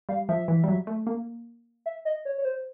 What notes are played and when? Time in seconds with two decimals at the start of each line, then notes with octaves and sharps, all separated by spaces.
0.09 G3 F5
0.29 F3 E5
0.48 E3
0.64 G3
0.68 F#3
0.87 A3
1.07 A#3
1.86 E5
2.05 D#5
2.25 C#5
2.38 C#5
2.45 C5